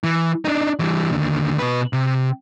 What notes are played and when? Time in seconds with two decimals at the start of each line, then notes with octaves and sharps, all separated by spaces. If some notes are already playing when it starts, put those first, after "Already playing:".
0.04 E3
0.45 D4 D#4
0.80 E3 G3
1.11 D#2 D3
1.59 B2 B4
1.93 C3